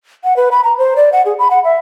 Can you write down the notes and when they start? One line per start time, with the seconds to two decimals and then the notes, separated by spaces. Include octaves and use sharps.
0.24 F#5
0.36 B4
0.51 B5
0.64 A#5
0.78 C5
0.96 D5
1.12 F#5
1.26 G#4
1.39 B5
1.51 F#5
1.64 E5